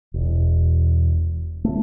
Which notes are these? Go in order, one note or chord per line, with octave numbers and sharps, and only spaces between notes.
E1
A3